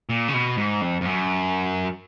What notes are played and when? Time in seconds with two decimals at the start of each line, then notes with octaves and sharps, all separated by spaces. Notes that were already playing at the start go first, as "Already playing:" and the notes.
0.09 A#2
0.28 C#3
0.34 B2
0.57 G#2
0.81 F2
1.01 F2
1.05 F#2